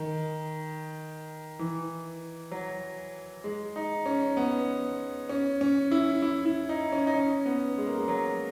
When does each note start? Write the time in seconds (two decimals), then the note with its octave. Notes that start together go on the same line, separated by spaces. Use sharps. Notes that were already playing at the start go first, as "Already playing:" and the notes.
Already playing: D#3
1.59 E3
2.52 F#3
3.44 G#3
3.76 D#4
4.06 C#4
4.37 B3
5.29 C#4
5.61 C#4
5.91 E4
6.22 E4
6.45 E4
6.69 D#4
6.92 C#4
7.07 D#4
7.15 C#4
7.46 B3
7.78 G#3
7.87 A#3
7.97 G#3
8.08 F#3